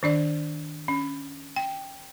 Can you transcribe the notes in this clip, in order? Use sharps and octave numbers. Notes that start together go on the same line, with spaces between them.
D#3 D4 D5
C#4
G5